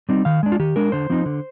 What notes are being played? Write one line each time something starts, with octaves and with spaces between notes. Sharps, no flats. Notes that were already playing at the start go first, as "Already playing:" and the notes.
G3 C4 D#4
D#3 F5
G#3 D4
F4
D#3 G4
G#3 D4 A#4
D3 C5
F3 C4 D#4
D3